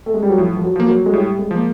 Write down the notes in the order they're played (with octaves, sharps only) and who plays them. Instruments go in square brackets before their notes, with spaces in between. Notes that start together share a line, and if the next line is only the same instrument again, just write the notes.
[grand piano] A3
G#3
G3
F#3
[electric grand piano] A2 [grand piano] F3
[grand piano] F3
F#3
[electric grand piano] F3 A#3
[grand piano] F#3
G#3
[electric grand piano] A2 [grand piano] G3
[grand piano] G#3
[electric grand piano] F3 A#3